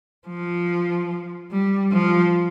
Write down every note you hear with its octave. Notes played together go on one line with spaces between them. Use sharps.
F3
G3
F3